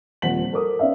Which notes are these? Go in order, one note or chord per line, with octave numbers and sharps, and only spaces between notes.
D#1 F3 C4 F#5 B6 F#7
A4 A#4 C5 D6 D#6
B3 C#4 D5 E5 F5